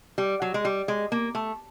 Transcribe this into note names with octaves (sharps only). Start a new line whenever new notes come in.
G3
F#3
G#3
G3
G#3
A#3
A3